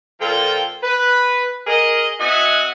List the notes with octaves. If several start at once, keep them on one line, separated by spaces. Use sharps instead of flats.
A#2 F3 F4 A4 A#4 G5
B4
G#4 A#4 D#5
C4 F#4 D#5 E5 F#5 G#5